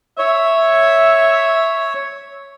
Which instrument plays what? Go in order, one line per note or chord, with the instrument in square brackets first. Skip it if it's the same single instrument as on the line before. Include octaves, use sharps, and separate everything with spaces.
[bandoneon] C#5 [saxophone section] E5